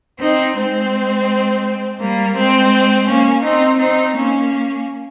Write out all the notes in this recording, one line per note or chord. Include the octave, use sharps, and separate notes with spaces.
C4 D#4
G#3 C4
G3 A#3
G#3 C4
A#3 C#4
C4 D#4
C4 D#4
A#3 C#4